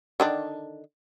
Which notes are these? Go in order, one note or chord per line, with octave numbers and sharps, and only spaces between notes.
D3 D#3 D4